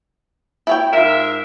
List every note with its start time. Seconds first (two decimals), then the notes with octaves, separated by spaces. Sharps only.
0.67 E4 C#5 G5
0.93 G#2 F4 A#4 E5